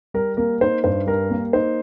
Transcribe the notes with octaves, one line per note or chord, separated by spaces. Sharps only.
G3 A#4
A#3 A#4
D#4 C5
G2 C5
G3 A#4
A#3
D#4 C5